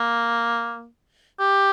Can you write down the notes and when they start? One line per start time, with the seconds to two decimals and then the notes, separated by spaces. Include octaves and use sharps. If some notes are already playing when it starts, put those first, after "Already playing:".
Already playing: A#3
1.40 G4